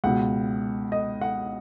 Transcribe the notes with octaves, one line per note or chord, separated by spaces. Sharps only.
C#2 B2 F#5
D#5
F#5